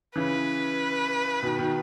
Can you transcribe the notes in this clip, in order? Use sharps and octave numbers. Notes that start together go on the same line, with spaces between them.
C#3 E3 B4
B2 D#3
B2 D#3